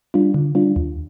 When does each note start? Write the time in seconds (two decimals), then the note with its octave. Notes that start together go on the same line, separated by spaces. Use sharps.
0.14 G3 D4 F4
0.34 D3
0.55 G3 D4 F4
0.76 D#2